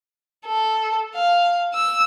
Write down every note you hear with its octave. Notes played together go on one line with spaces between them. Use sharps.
A4
F5
E6